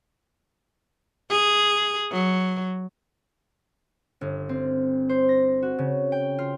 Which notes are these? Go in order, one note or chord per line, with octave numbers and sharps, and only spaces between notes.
G#4
F#3
G1
C4
C5
A#6
F#4
C#3
G5
F4